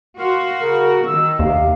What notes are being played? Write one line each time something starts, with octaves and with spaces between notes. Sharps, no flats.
F#4 A#4 F5 C6
C#3 A#4
D#3 E6
D#2 C3 F5